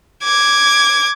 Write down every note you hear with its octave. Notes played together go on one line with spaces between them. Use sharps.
D6 G#6